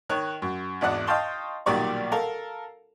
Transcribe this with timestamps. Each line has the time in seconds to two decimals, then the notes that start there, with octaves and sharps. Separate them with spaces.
0.09 D#3 C#5 F#6
0.42 F#2
0.81 G#1 E2 D4 F#5 F#6
1.07 D#5 F5 G5 A5 C6 C#6
1.66 B1 A#2 D#3 G3 D5 C#6
2.12 A4 A#4 F5